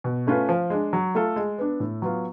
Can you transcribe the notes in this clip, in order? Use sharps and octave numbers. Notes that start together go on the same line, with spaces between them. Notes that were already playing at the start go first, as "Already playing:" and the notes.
B2
A3 C#4 F4 B4
F3
G#3 D4
F#3
A3 F4 A4
G#3
B3 D4
A2
F#3 B3 F4